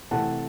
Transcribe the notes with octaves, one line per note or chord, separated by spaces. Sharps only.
C3 E3 A3 C4 F#5 A5